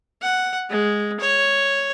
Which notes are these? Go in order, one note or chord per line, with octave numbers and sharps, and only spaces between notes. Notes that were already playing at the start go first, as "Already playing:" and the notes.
F#5
G#3
C#5